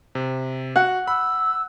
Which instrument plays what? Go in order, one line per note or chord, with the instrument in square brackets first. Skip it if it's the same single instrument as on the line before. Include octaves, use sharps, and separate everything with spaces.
[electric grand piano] C3
[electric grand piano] F#4 [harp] F#5
[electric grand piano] B5 [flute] E6